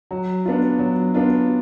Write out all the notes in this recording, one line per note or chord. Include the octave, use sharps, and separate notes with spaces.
F#3
B3 D4 F4
F#3
B3 D4 F4